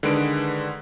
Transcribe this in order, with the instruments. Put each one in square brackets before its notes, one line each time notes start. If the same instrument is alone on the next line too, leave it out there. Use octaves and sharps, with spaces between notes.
[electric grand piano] D3 D#3 G#3 B4 D7